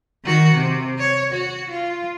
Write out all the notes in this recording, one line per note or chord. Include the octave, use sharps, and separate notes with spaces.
D#3 F#4
C3
C#5
F#4
F4